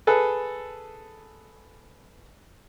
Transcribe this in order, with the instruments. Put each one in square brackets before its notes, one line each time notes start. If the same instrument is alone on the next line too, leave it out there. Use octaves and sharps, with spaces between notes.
[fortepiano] G#4 A4 B4